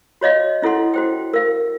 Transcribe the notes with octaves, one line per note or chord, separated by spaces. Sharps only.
F#4 C#5 D#5 F5
C#4 E4 A4 F#5 C6
F#4 C5 G5
A#4 F5